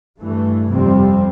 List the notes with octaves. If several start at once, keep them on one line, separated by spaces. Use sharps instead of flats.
G2 E3 A3
F2 C3 G3 C4